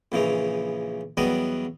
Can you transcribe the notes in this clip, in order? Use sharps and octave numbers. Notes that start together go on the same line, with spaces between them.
A#1 C#3 E3 D#4
E2 F#3 G3 B3 D5 D#5